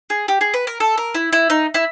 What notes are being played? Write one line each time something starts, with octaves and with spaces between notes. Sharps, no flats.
G#4
G4
G#4
B4
A#4
A4
A#4
E4
E4
D#4
E4